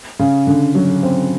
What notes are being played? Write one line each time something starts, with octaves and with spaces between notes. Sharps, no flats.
C#3
D3
F#3
C4